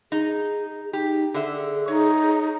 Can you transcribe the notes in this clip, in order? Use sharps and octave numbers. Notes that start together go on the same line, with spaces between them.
D#4 G#4
D#4 G4
D3 G#4 E5
D#4 C#5